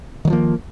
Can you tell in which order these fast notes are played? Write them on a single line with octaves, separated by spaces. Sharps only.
D#3 F#3 F3 A#3